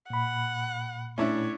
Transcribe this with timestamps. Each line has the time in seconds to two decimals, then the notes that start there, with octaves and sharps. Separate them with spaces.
0.10 A#2 F#5 B5
1.18 A2 C#4 D4 E4 C#5